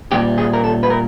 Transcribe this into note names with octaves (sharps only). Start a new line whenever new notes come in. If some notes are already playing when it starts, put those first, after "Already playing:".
A#2 G3 G4
G#4
A#4
A4
B4
A#4